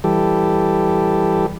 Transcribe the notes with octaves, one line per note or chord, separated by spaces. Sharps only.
E3 G3 G4 A4